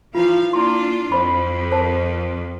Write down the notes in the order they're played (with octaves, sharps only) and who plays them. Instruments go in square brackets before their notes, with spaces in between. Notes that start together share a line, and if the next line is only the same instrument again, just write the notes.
[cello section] E3 F3 F5 [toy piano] E4 F4
[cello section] A#3 D4 F4 [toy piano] E4 C6
[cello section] F2 [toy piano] C5 B5
[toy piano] A#4 C5 A5